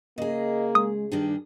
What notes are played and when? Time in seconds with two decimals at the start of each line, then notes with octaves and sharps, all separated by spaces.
0.18 C#3 A#3 G#4 D#5
0.75 G#3 D#6
1.12 G2 D#3 G3 D4 G#4